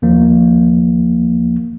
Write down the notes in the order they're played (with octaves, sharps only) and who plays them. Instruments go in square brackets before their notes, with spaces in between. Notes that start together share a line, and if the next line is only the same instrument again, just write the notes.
[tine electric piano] D#2 F3 A#3